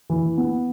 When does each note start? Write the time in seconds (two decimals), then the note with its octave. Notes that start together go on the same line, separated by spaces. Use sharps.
0.10 E3
0.38 B3